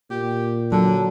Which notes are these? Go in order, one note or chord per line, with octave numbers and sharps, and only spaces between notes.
A#2 G4
D3 F#3 A5